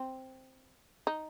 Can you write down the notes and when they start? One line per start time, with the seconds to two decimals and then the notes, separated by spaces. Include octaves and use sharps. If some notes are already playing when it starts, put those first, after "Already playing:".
Already playing: C4
1.07 D#4